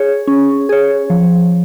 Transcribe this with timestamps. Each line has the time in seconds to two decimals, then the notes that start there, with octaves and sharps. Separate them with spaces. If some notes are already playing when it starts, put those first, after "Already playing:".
Already playing: G#4 C#5
0.27 C#4
0.69 G#4 C#5
1.10 F3